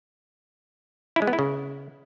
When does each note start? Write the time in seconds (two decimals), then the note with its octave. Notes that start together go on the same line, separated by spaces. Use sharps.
1.16 E4
1.22 G#3
1.27 B3
1.33 E4
1.39 C#3